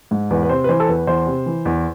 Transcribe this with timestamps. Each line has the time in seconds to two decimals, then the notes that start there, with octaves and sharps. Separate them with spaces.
0.11 G#2
0.30 E2 B4
0.43 B4
0.49 C3 C5
0.64 B4
0.69 E3 C5
0.80 A4
0.88 E2 B4
1.07 E2 C5
1.26 C3
1.46 E3
1.65 E2